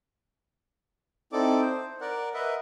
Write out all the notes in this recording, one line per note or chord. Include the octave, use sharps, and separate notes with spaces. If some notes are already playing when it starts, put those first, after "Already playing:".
C4 D#4 E4 A4 D5 D6
C5
A#4 D5 F#5
A#4 B4 D#5 E5 F#5